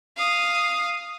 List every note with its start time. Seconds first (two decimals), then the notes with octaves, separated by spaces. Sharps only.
0.18 F5 D#6